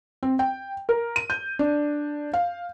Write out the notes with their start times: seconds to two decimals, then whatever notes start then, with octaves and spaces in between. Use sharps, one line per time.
0.23 C4
0.39 G5
0.89 A#4
1.16 D#7
1.30 G6
1.59 D4
2.33 F5